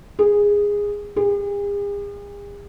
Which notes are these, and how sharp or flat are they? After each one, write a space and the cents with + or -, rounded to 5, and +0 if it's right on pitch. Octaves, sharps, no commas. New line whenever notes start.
G#4 -15
G#4 -45